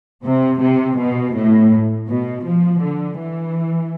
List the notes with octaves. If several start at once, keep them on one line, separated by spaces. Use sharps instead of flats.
C3
C3
B2
A2
B2
F3
D3
E3